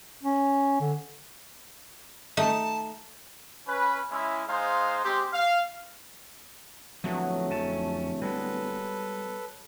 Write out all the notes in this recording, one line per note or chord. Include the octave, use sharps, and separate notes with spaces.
C#4
D3
A3 D#4 A5
C#4 B4
G#3 C#4 E4
G#3 D#4 G#4 C5 F5
G#3 C4 G4
F5
D1 F3 F#3 A3 B3 F#4
F2 C#4 A5
G3 G#3 B3 A4 B4